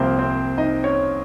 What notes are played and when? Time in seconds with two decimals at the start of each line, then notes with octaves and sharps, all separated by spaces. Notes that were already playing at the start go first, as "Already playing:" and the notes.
Already playing: C2 C3 F3 A#3 C4 C5
0.19 C4 C5
0.58 D#4 D#5
0.84 C#4 C#5